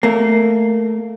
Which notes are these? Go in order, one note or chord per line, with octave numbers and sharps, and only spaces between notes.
A3 A#3